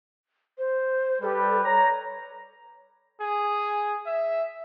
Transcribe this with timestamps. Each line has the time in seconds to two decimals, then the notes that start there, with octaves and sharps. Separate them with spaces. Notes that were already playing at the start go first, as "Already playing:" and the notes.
0.58 C5
1.22 G3 G4 A4 B4
1.64 C#5 A#5
3.21 G#4
4.06 E5